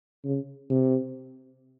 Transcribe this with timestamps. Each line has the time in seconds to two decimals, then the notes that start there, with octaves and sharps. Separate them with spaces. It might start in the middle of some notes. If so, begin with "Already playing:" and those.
0.24 C#3
0.70 C3